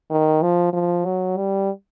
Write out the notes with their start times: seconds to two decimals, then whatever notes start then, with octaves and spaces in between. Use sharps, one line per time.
0.10 D#3
0.42 F3
0.73 F3
1.05 F#3
1.37 G3